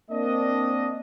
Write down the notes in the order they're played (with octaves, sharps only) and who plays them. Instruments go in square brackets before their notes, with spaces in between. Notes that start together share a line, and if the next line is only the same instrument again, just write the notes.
[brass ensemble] A#3 C4 D4 D#5